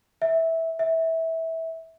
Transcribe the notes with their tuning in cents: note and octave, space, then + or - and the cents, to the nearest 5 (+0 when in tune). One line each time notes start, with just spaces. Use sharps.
E5 -15
E5 -20